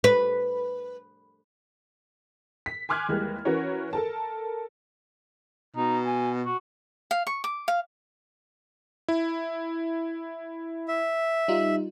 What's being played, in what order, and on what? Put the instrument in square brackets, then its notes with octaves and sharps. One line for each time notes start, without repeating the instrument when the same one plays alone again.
[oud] B4
[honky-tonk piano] B6
G#5 C6 D6 F6 F#6 G#6
D#2 E3 G3 G#3
E3 C#4 F#4 A#4 B4 C#5
A4 A#4 A5
[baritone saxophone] B2 [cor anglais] D#4
[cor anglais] G#5
F#4
[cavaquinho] F5
C#6
D6
F5
[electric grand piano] E4
[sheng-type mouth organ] E5
[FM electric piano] G3 D#4 F4